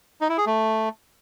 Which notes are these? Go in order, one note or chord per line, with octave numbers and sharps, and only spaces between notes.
D#4
E4
G#4
A3